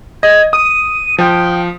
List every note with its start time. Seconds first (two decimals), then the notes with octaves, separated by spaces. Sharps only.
0.23 D#5 G#6
0.53 D#6 D#7
1.18 F3 G5